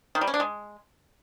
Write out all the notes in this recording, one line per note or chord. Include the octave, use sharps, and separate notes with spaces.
D#3
G3
C#4
D4
G#3